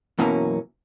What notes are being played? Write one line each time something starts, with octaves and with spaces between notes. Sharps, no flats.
F#2 B2 E3 F#3 A#3 C#4